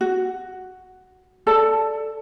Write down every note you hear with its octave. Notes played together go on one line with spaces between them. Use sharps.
F#4
A4 D5 A5